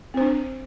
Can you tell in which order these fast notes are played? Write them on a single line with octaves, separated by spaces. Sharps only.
C4 C5 D4